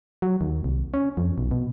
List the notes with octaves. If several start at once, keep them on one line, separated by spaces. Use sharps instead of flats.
F#3
D#2
C2
C#4
F2
B1
B2